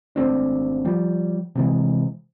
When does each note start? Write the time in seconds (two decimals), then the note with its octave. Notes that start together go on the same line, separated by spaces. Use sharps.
0.16 G#1 A3 C4 D4
0.85 F3 G3
1.55 C3 E3 G#3